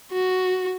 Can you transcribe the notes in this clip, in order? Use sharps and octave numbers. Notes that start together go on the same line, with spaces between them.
F#4